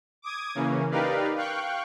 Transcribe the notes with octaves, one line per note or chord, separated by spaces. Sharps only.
D6 D#6 G#6
C#3 E3 A#3 C#4
D#4 G4 A#4 B4 D5 F5
F5 G5 C#6 F#6